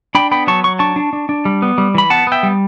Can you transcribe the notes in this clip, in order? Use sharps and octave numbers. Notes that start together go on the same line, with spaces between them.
D4 G5 B5
B3 G5 B5
F#3 A5 C#6
F#3 C#6
D4 A5 C#6
D4
D4
D4
G3
B3
G3
E3 B5
B3 F#5 A5
B3 E5 G5
G3